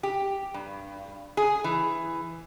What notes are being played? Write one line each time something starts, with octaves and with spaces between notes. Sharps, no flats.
G4
G2
G#4
E3